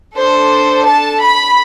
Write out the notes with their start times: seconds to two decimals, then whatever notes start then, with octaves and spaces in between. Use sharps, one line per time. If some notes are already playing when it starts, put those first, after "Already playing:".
0.17 D4 A4 C5
0.87 A5
1.22 B5